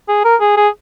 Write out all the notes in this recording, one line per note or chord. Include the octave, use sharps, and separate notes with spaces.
G#4
A#4
G#4
G#4